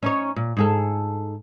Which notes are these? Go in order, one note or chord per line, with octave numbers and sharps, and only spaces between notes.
C#4 D#4 C#5
A#2
G#2 G#4 A4